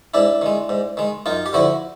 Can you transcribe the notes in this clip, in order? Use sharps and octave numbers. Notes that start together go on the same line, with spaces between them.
G#2 D4 E4
D#3 G#3
G#2
D#3 G#3
F#2 D#4 F4
G4
D3 F3 E4 F#4